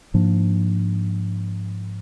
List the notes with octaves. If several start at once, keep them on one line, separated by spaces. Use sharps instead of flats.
G#2 F3 A#3 D4